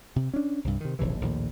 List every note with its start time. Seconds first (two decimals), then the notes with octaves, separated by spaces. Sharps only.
0.16 C3
0.34 C#4 D4
0.64 C2 G2
0.80 C3 D#3
0.99 D#1 A#1 C3 E3
1.21 A#1 D#2 A2